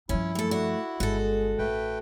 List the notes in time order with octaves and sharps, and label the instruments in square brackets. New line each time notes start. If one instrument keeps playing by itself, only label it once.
[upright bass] G2 F3 [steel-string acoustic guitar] C#4 [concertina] E4
[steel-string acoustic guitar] F#2 A4 [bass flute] A3
[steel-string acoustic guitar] D4 F#4
[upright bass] G1 [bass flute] G#3 [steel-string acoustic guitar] F#4 A4
[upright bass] A1 [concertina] A3 B4 G5